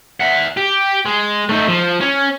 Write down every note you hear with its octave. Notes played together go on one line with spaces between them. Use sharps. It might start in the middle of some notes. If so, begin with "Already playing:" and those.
E5 F#5
G4
G#3
A3 D#4
F3
C#4